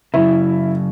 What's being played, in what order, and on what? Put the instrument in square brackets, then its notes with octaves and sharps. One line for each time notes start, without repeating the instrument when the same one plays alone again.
[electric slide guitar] F#2 C#3 [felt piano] E4